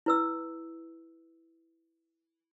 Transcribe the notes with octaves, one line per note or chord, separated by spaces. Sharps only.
E4 B4 E6